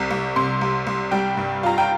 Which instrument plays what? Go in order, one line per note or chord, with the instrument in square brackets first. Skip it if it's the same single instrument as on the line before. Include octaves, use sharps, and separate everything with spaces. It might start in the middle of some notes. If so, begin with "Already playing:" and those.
Already playing: [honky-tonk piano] C2 C3
C2
C3 C6
C2
C2
G3 G5
G2
F4 A#5
G5